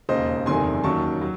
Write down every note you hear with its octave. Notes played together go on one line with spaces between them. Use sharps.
E1 D#2 C#3 C5 D#5
F#1 E2 C3 D#3 A3 G#5 C6
D#2 D#3 F#3 C#4 A5 C#6
F#3